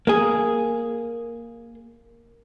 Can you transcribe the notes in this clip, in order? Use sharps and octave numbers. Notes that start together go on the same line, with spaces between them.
A#3 G#4